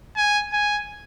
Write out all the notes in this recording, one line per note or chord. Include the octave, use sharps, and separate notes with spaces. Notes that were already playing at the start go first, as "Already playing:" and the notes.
G#5
G#5